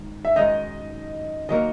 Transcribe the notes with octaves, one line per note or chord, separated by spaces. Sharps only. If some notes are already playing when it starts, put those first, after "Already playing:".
Already playing: G#2 D#3
E5
F#2 D#3 G#3 D#4 D#5
D#3 F#3 A#3 D#5